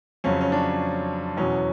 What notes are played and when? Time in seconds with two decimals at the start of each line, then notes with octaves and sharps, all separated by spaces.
0.24 F2 C#3 F#3 C#4
0.41 C#4
0.52 D4
1.37 E2 B2 F#3 C#4